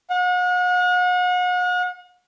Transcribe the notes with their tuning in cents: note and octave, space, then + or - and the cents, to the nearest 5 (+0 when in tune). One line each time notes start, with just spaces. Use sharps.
F#5 -40